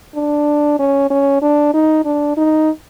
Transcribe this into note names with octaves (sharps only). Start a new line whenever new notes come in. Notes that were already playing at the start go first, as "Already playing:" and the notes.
D4
C#4
C#4
D4
D#4
D4
D#4